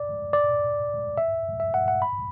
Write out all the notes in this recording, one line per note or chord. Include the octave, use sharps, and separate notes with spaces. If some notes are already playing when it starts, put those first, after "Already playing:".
Already playing: D5
D5
E5
E5
F#5
F#5
B5